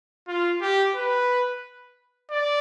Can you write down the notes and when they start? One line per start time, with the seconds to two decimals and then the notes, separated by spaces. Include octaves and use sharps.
0.28 F4
0.61 G4
0.95 B4
2.31 D5